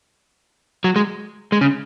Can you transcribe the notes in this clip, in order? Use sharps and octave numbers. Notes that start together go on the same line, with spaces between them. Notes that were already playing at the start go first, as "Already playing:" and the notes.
F#3
G#3
G#3
C#3